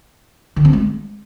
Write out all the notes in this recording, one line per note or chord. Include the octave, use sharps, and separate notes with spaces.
D3
C4
G#3